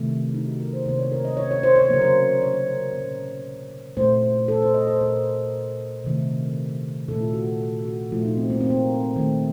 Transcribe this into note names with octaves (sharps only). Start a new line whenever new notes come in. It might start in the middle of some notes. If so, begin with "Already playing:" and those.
Already playing: C3 D#3 A3
D#4
F#4
A#4
C5
C3 D#3 A#3 C5
C#5
A#4
D#5
C#5
C#5
C5
C#5
C5
C#3 F#3 A#3 A#4
C5
C#5
A#4
A#2 F#3 A#3
A#2 A3 C5
A4
C5
D#5
C5
A#2 A3 A#4
C3 D#3 A3
A#2 A3 A4
F4
F#4
A4
A4
F#4
A#2 F3 A3 F4
D#4
C4
A#3
C4
A#3
D#3 A3